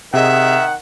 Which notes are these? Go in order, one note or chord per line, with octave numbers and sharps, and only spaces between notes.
C3 D#3 G#4 D#5 E5 F#5